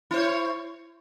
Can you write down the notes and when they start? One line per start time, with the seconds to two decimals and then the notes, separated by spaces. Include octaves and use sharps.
0.11 E4
0.14 C5
0.17 C#5